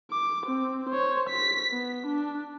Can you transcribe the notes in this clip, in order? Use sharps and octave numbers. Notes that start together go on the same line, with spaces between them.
D6
C4
C5 C#5
B6
B3
D4